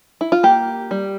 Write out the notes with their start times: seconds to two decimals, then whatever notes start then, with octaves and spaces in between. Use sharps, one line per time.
0.21 E4
0.32 F4
0.43 A#3 G4
0.91 G3